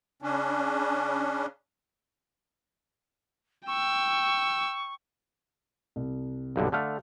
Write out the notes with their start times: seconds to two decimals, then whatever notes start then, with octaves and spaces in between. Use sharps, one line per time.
0.22 C#3 C#4 D4
3.67 G5 C#6 E6
5.96 C2
6.56 B1 G2 D3
6.72 D3 A3 F5 A5 F6